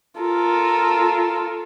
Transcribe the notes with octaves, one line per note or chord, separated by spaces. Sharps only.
F4 A4 A#4